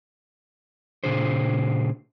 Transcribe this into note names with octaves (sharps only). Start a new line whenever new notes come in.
A#2 C#3 D4 G#4 C5